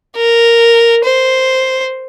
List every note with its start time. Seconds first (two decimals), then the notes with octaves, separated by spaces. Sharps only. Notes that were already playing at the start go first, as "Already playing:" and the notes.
0.16 A#4
1.04 C5